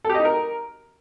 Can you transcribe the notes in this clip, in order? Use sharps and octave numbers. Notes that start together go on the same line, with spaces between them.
A4
G4
D#5
D#4
A#4